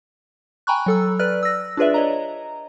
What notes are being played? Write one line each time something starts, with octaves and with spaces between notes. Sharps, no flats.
G5 G#5 A#5 B5 C#6 F#6
F#3 A4 E6
B4 D5 F6 F#6
E6 A#6
D4 F4 G#4 B4 D5 E5
C#5 D#5 A#5